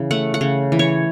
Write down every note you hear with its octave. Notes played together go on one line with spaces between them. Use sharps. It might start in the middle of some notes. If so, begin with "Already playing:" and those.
Already playing: C#3 E3
A3 F#5
F#5
C#3
E3
C#5